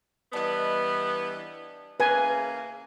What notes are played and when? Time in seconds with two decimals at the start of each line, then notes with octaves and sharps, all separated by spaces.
0.33 E3 G3 B3 D4 D#5
2.00 C#3 E3 A#3 G#4 B4 G#5